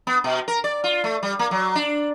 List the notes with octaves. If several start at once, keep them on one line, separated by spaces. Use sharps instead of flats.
B3
B2
A#4
D5
F4
A3
G3
A#3
F#3
D4